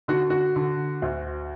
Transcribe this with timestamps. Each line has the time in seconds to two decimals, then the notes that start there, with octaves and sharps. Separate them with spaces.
0.08 D3 F#4
0.30 F#4
0.56 D3
1.02 D2